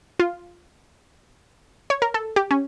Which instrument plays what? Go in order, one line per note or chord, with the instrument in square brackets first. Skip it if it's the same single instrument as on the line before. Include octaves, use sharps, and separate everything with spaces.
[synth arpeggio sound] F4
C#5
A#4
A4
G4
C#4